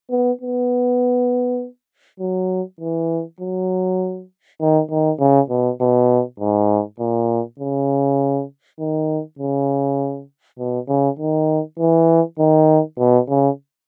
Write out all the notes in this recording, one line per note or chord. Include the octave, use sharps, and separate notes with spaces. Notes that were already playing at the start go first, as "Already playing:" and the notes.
B3
B3
F#3
E3
F#3
D#3
D#3
C#3
B2
B2
G#2
A#2
C#3
D#3
C#3
B2
C#3
D#3
E3
D#3
B2
C#3